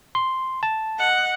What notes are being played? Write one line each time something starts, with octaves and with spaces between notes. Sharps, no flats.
C6
A5
D#5 F#5